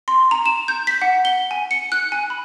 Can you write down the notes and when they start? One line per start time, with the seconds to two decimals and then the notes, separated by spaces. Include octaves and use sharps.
0.08 C6
0.31 A#5
0.46 E7
0.68 G6
0.87 B6
1.02 F#5
1.25 G7
1.51 G#5
1.71 C#7
1.92 F#6
2.12 G#5
2.30 B5